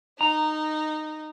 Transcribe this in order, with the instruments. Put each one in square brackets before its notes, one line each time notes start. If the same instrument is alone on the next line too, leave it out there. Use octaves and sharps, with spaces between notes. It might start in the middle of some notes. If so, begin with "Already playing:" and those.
[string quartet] D#4 [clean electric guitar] A#5